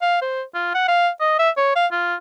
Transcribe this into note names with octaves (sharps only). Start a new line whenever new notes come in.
F5
C5
F4
F#5
F5
D#5
E5
C#5
F5
F4